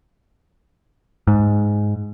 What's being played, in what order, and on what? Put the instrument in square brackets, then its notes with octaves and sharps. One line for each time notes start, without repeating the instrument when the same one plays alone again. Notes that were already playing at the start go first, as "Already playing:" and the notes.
[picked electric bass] G#2